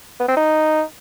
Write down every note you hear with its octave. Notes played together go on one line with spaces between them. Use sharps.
B3
C4
D#4